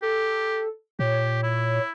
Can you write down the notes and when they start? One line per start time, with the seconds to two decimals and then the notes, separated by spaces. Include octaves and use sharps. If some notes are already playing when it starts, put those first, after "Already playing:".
0.02 G4 A4
0.99 A#2 G4 C#5
1.43 E4